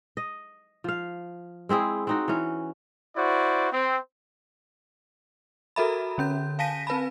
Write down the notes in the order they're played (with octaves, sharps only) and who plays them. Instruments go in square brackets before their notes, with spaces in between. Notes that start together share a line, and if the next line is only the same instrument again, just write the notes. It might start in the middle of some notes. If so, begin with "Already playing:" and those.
[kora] D#5
F3 F5
G#3 C4 E4 G#4
C4 D#4 F#4
E3 C#4
[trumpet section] E4 F#4 C5 D5
C4
[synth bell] F#4 A4 A#4 E5 A#5 B5
D3 C#4 G6
F5 G#5 A5 A#6 B6 D#7
C4 B4 A5 B5